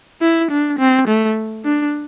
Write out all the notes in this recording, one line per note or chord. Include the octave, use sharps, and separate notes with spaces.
E4
D4
C4
A3
D4